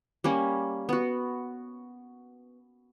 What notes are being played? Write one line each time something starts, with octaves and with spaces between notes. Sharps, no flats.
G3 A#3 C#4
B3 F#4